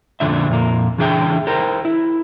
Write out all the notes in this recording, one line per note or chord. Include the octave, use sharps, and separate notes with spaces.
F2 A#2 D3 D4 E5
F2 A#2 A#3
C#3 E3 D4 G#4 E5 G5
G4 A#4 C5
E4